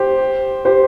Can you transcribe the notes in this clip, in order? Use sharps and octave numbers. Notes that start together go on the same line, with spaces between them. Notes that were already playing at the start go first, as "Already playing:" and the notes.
Already playing: G4 C5
G4 C5